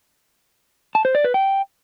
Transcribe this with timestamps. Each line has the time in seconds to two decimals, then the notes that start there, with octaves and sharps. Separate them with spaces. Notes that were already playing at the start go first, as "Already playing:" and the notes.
0.95 A5
1.05 C5
1.15 D5
1.24 B4
1.34 G5